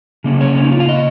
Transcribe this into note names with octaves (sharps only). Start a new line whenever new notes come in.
C#3 A#3 C#4
C#5
C#4
D#4
F4
F5
D#5